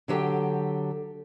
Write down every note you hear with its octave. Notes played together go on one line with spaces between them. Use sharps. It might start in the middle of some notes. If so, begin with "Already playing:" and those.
D3 F#3 G4 A4 G5